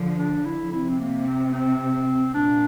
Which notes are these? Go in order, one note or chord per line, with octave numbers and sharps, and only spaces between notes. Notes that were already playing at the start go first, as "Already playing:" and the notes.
Already playing: D3 F3
D4
E4
C3 E4
C4
A#3
C4
C4
A#2 D4